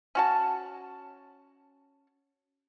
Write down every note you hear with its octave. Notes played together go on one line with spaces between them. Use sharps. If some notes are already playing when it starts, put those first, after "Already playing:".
C#4 F#4 A5